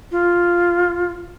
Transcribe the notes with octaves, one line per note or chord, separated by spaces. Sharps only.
F4